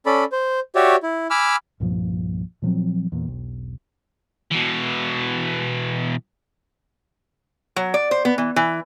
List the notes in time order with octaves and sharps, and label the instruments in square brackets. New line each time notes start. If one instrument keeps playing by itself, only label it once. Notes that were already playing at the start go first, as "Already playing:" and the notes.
[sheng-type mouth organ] C#4 A4 D5 B5
C5
F#4 G4 C#5 D5 E5
E4
G#5 B5 D6 E6 F6
[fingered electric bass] C2 G2 A#2 F3
A#2 F3 F#3 C4
E2 A#2
E1 B1
[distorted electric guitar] B2 E3
[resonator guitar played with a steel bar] F#3
D5
C5
B3
E3
E3